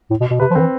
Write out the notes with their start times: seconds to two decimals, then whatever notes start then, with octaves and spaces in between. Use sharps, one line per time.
0.10 A2
0.20 B2
0.31 B2
0.40 C3 B4
0.51 F3
0.55 D3 C4
0.60 E3